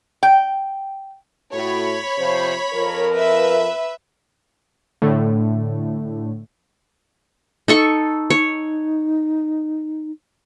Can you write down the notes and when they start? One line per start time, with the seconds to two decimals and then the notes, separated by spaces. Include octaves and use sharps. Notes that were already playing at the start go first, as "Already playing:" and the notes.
0.23 G5
1.53 A2 F#4 C#5 B5
2.18 C3 F3 C5
2.73 F2 F3 A#4
3.13 B4 E5
5.02 A2 D3 A3
7.68 D#4 A4 C#6
8.30 D#4 C#5